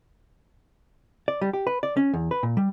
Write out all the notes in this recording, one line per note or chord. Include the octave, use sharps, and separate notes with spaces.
D5
G3
G4
B4
D5
C#4
E2
B4
A#2
G3